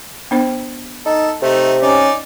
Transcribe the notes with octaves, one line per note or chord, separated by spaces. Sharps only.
B3 D4 C5
D#4 A4
C3 A3 D#4
C#4 D#4 D5